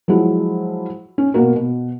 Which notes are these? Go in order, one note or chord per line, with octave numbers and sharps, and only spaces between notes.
F3 F#3 G#3 E4 F4
C#4
B2 A#3 F#4 A#4
B2